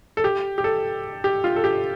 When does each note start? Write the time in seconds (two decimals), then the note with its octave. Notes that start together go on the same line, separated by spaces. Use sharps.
0.17 A4
0.24 G4
0.58 G4
0.64 A4
1.24 G4
1.44 F4
1.56 A4
1.64 G4